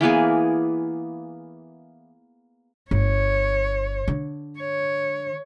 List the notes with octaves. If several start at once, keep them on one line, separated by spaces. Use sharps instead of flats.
E3 A#3 B3 G#4
G1 C#5
D3
C#5